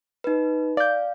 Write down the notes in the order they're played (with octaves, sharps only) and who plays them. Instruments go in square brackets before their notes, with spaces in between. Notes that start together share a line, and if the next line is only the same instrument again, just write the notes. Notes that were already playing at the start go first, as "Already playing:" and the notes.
[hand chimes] D#4 B4
[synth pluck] D5 G6 [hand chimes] F5